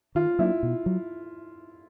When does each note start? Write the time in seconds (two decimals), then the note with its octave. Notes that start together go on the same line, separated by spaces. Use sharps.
0.15 D#3 F4
0.39 F#3 A#3 D4 E4
0.63 B2
0.86 F#3